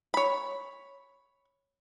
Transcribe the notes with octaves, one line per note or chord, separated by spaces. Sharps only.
C#5 B5